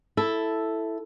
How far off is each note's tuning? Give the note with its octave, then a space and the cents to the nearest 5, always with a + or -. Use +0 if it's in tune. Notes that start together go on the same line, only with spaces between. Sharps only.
E4 +0 A4 +0